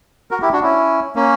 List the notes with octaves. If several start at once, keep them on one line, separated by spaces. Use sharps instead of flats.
F#4 A#4
E4 G4
D4 F#4
C#4 E4
A#3 C#4